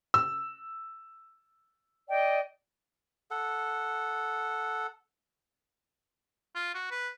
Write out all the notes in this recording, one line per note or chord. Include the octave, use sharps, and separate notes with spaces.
E6
D5 D#5 G5
A4 F#5
F4
F#4
B4